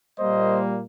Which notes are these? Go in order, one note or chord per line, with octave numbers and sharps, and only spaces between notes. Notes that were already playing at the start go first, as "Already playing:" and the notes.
A#2 G3 A#3 C5 D#5